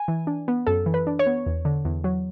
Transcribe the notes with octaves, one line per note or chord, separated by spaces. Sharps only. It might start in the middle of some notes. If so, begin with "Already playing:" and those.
Already playing: G#5
E3
D4
B3
F#2 A4
E3
B4
D4
C#5
B3
E2
D3
E2
F#3